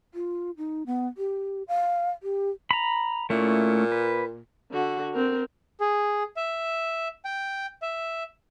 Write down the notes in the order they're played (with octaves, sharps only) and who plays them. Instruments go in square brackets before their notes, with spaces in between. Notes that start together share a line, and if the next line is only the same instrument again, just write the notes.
[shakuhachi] F4
D#4
B3
G4
F5
G4
[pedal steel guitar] A#5 B5
[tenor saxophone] A#2 [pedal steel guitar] A3 C#4 E4
[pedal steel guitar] B4
[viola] D3 F#4
C4 A#4
[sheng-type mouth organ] G#4
E5
G5
E5